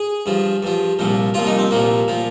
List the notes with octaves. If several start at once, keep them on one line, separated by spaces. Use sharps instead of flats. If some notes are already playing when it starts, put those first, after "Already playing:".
Already playing: G#4
G2 F3
G2 F3
C2 A#2 F3
C2 A#2 F3 F4
D#4
C4
C2 A#2 F3 A#3
A#2 F3